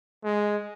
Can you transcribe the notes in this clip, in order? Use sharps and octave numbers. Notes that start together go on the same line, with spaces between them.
G#3